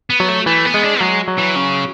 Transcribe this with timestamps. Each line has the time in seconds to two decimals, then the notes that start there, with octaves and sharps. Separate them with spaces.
0.10 B3
0.20 F#3
0.29 A3
0.46 E3 A3
0.65 B3
0.74 G#3
0.83 D4
1.01 F#3 G#3
1.28 F#3
1.38 E3
1.56 C#3